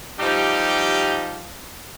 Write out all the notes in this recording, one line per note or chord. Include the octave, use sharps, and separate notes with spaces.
F3 G3 D#4 G4